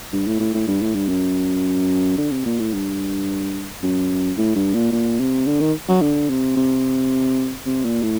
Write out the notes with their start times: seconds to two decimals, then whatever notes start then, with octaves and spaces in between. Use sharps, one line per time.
0.13 G2
0.27 A2
0.40 A2
0.54 A2
0.68 G2
0.82 A2
0.95 G2
1.09 F#2
2.18 D3
2.32 C3
2.46 A#2
2.59 A2
2.73 G2
3.83 F#2
4.37 A2
4.55 G2
4.74 A#2
4.92 A#2
5.20 C3
5.47 D3
5.61 D#3
5.88 F#3
6.02 D3
6.30 C3
6.57 C3
7.66 C3
7.85 A#2
8.03 A2